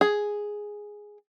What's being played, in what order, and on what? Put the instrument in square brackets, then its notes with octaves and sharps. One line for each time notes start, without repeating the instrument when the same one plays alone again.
[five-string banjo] G#4